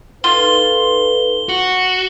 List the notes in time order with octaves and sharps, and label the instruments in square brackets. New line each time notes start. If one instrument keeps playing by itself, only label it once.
[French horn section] D#4 A4 B4 [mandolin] F4 [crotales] G7
[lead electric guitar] F#4